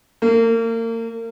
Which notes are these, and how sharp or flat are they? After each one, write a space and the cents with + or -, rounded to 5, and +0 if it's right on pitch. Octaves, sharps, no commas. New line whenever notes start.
A#3 -35